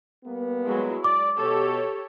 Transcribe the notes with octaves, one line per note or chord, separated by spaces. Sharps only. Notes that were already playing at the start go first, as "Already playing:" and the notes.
G3 A#3 B3
F#3 G#3 E4
D5 D6
B2 G4 A4 C#5